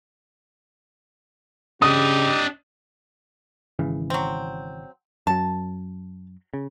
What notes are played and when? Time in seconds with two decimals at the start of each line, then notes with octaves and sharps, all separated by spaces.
1.82 C#3 D4 G4 D#5 D#6
3.79 G#1 C#3 E3
4.10 F#3 C4
5.27 F#2 F#3 A5
6.54 C#3